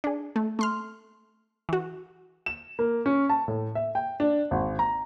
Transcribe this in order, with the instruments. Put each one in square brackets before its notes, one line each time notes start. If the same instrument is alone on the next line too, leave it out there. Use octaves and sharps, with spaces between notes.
[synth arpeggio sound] D4 G#4
A3
A3 C6 F6
E3 F#4
[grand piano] E7
A#3
C#4
A5
A2
E5
G5
D4
G#1
A#5